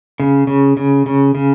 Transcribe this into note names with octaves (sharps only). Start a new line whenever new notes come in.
C#3
C#3
C#3
C#3
C#3